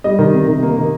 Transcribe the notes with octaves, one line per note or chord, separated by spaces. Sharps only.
G3 D#5
D#3
C3
D#3
A#3
D#3